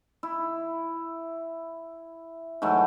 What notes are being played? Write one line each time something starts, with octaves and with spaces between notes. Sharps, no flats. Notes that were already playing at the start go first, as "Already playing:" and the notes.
E4
G#2 E3 F#3 A3